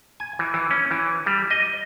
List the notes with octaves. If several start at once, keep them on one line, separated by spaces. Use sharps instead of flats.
G#5
E3
E3
C#4
E3
G3
D#5